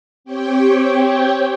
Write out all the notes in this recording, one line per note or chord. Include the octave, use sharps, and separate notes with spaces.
C4 G4 C#5 G5